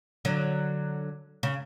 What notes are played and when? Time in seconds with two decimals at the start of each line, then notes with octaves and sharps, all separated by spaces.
0.25 D3 F#3
1.43 C#3